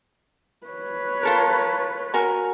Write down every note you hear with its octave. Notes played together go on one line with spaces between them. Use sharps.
B4 C#5
F4 A4 A#4
F#4 A#4 G#5